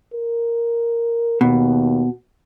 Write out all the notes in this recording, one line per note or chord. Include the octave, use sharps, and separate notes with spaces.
A#4
D#2 B2